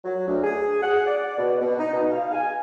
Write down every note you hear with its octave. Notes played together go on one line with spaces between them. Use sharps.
F#3
D2
G#4
F#5
D5
B2
B2
D#4
B2
F5
G#5